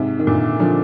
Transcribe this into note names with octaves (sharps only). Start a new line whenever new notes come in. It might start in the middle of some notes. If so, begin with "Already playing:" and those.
Already playing: G#2 C3
D#3
A#2 D3
D3 F3